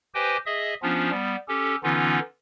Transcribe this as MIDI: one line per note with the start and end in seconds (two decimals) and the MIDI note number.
0.14 0.37 67
0.14 0.37 71
0.14 0.37 72
0.14 0.37 75
0.14 0.37 79
0.14 0.37 80
0.46 0.74 68
0.46 0.74 75
0.46 0.74 76
0.46 0.74 87
0.82 1.11 53
0.82 1.11 59
0.82 1.11 61
0.82 1.11 62
0.82 1.11 65
1.11 1.36 55
1.11 1.36 59
1.48 1.76 61
1.48 1.76 67
1.48 1.76 69
1.83 2.19 50
1.83 2.19 52
1.83 2.19 59
1.83 2.19 61
1.83 2.19 63
1.83 2.19 65